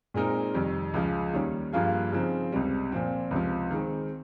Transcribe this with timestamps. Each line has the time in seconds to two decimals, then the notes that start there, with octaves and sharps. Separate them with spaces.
0.14 A#2 G#3 C4 D#4 A#4
0.54 F2 C3 D#3 G3
0.94 C#2 C#3 F3
1.33 D#2 D#3 G3 C#4
1.73 G2 F3 A#3 F4 G#4
2.12 C#3 F3 C4 D#4
2.52 C#2 C3 G3
2.92 A#2 F3 C4
3.31 C#2 C3 F3
3.71 D#3 G#3 C4